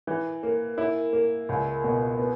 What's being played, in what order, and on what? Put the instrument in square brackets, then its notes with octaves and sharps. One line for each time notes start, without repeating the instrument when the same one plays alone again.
[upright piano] E3
A#3
E4
A#3
C#2
B2
B3